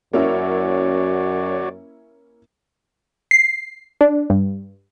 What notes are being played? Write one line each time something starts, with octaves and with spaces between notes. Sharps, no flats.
F#2 A#3 C#4 E4 F#4 C#5 D5
C7
D4
G2